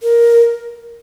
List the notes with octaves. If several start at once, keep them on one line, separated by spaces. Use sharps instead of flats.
A#4